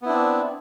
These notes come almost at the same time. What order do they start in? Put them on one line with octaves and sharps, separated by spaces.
B3 E4 D4 C4